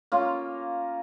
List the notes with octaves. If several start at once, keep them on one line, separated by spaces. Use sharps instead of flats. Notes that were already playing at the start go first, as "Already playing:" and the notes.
A#3 C#4 F4